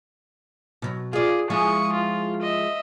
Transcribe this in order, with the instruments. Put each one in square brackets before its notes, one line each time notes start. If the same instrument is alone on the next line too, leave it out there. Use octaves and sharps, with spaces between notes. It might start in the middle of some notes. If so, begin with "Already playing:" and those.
[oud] B2 F#3
[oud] F4 D5 [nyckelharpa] G#4
[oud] F3 G#3 E4 [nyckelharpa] C#6 D#6
[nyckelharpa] F4
D#5 E5